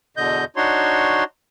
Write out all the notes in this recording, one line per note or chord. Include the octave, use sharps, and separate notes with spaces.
E2 B2 D3 D#5 G6
D4 D#4 F#4 C#5 C6